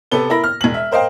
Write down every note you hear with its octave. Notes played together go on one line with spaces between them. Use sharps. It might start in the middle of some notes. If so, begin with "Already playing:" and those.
C3 B3 A4 B4 G7
E4 A#4 B5 A#6
F6
E1 F#7
E5
A#4 C5 D#5 F5 G5